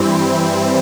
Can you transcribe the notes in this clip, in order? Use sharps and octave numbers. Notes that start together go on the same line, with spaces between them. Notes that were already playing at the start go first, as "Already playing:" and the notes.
Already playing: G2 E3 G3 C4 E4